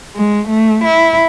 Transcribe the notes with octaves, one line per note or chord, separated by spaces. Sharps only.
G#3
A3
E4